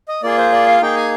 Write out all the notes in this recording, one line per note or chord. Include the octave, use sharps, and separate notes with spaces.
D#5
A#3 F4 G#4 D5
C5
D5
F5
A#3 D#4 G#4 G5
G#5